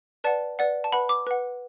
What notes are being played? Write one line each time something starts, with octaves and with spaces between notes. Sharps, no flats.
B4 D5 F#5 A5
B4 D5 F#5
A5
B4 F#5 B5
D6
B4 F#5